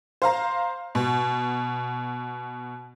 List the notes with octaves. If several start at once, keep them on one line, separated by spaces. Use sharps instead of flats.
C5 F5 A#5
B2